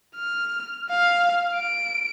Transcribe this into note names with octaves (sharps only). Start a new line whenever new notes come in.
F6
F5
D7